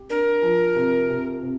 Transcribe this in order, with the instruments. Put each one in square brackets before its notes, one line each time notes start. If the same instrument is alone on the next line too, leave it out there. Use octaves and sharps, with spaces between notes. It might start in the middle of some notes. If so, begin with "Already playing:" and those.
Already playing: [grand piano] G4
[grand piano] D4 [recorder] A#4
[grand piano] F3
C3
C3
C3